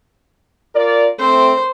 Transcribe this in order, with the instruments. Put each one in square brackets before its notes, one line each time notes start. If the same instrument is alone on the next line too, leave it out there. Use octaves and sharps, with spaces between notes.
[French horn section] F4 A#4 D5
[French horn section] A3 C4 [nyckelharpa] C5